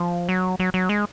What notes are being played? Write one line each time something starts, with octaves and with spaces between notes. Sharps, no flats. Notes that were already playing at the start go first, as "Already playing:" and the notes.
Already playing: F3
F#3
F#3
F#3
G#3